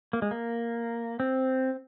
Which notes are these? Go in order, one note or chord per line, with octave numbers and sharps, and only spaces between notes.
A#3
G#3
A#3
C4